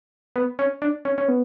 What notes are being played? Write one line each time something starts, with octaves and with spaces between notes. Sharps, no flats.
B3
C#4
D4
C#4
C#4
B3